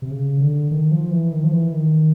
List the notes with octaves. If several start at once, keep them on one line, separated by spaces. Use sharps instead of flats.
C3
C#3
D3
D#3
F3
E3
D#3
F3
E3
D#3